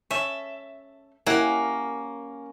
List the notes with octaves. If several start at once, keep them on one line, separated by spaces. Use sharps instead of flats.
C#4 A4 E5
A#3 C#4 E4 G4 F#5